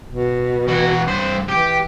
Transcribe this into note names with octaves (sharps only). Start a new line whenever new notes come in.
B2
E3 F#4
G2 C5
E3 G4